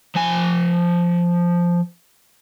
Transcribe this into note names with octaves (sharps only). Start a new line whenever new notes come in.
F3 G#5